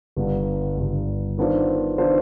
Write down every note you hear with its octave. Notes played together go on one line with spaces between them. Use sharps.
G1 G2 D3
G1 G2 D3
D#3 B3 D4 F4 C5
D#3 B3 D4 F4 C5